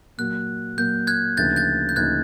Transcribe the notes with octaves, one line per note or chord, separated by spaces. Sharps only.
A#2 F#3 A#3 F#6
A#2 F#3 A#3 G6
F#6 G#6
D2 C#3 F3 A#3 D#4 G6 A6
G6 A6
G6
D2 C#3 F3 A#3 D#4 F#6 G#6